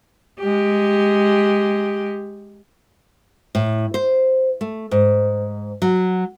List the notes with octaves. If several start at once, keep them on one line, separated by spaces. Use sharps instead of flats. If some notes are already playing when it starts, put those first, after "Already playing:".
G#3 G4
A2
C5
A3
G#2
F#3